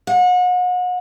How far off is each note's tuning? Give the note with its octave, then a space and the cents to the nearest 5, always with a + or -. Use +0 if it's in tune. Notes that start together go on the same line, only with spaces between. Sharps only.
F#5 -35